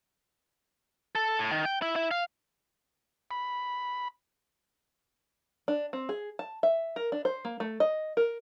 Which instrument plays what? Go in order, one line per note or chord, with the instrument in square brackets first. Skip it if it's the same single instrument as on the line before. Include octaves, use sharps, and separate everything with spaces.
[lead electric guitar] A4
A2
D#3
G5
E4
E4
F5
[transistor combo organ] B5
[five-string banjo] D4
C4
G#4
A5
E5
A#4
D4
C5
A#3
A3
D#5
A#4